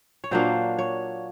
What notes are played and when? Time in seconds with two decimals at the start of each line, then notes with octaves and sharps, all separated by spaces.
0.24 C#5
0.31 A#2 F#3 A#3 D4 C5
0.78 C#5